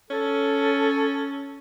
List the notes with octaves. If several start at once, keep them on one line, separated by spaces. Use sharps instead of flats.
C#4 A4